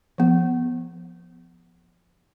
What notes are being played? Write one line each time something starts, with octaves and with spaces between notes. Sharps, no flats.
F3 B3